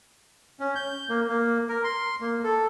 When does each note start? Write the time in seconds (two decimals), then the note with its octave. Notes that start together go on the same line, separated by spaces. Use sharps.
0.60 C#4
0.76 G6
1.09 A#3
1.28 A#3
1.68 A#4
1.84 C6
2.21 A#3
2.44 A4